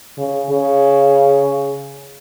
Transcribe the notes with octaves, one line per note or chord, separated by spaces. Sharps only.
C#3
C#3